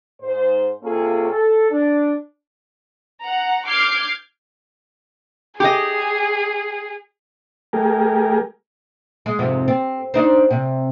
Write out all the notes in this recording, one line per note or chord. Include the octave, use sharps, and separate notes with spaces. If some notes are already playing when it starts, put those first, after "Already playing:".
G#2 C5
C3 A#3 C#4 F4 G#4 A4
A4
D4
F#5 A#5
D6 F6 G6 G#6 C7
G4 G#4 D#5
A3 G4 G#4 A#4
G#3
F2 G#2 C3
C4
D4 D#4 C5
C3